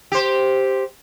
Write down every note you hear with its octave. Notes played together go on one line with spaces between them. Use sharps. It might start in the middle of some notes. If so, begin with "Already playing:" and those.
G4 C5